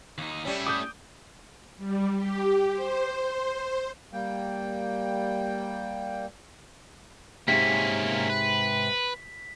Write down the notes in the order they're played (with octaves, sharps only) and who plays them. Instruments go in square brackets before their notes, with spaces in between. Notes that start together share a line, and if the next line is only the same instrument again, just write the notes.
[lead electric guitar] D#2 D#4
[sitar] G3 C#4 [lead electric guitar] A3 E4
[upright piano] D6 D#6 G6
[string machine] G3
G4
C5
[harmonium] G3 A#3 G5
[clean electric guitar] G#2 C3 [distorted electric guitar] A#3 C#4 [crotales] B6
[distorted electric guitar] B4